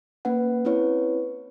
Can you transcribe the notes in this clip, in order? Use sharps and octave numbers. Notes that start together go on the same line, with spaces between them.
A#3 C#4 B4 F#5
C4 C#4 E4 B4 C#5